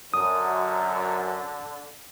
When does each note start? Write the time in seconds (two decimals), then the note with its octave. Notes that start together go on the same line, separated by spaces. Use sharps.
0.14 F#2 D3 D#6